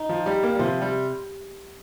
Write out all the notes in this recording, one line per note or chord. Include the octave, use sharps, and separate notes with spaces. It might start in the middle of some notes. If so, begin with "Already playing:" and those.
Already playing: D#4
F3
G3 G4
A#3
G3
C3 F3
G3